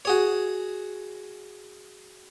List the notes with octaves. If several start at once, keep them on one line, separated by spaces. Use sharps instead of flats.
F#4 G#4 C#5